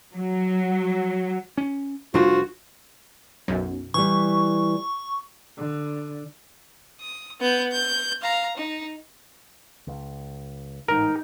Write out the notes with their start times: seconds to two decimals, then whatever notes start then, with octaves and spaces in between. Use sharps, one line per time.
0.14 F#3
1.58 C#4
2.14 F1 G3 D4 F4 F#4 C5
3.48 B1 F#2
3.94 E3 G3 C#6
5.57 D3
7.01 D#6
7.41 B3 G6
7.72 G6
8.22 F5 A#5
8.58 D#4
9.87 C#2
10.88 A1 G#2 D#4 A#4